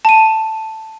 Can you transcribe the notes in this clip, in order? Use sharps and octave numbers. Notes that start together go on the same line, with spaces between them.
A5 D#7